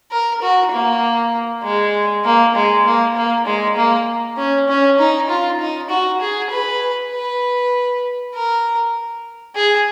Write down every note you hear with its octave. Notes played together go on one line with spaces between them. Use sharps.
A#4
F#4
A#3
G#3
A#3
G#3
A#3
A#3
G#3
A#3
C#4
C#4
D#4
F4
D#4
F#4
G#4
B4
B4
A#4
G#4